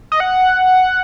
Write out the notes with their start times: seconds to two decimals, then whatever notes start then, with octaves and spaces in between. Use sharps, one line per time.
0.12 D#5
0.20 F#5